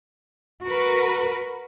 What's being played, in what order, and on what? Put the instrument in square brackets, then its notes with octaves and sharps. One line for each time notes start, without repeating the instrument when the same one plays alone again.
[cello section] F#4 A#4 B4